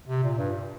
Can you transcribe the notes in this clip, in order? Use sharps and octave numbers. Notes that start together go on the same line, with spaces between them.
C3
A#2
G2